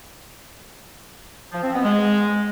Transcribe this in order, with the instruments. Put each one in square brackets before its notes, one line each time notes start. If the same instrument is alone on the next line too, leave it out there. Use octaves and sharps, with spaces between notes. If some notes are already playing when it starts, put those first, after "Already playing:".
[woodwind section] F3
C4
B3
G#3